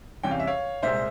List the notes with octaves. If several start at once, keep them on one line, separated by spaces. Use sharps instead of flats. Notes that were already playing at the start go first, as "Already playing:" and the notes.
E2 C3 E3 G3 C#4 G5
F5
E5
C#5 F5
C2 A#2 G#3 C5 E5